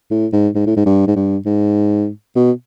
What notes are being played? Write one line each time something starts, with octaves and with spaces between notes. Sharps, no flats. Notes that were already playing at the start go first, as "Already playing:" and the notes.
A2
G#2
G#2
A2
G#2
G2
G#2
G2
G#2
B2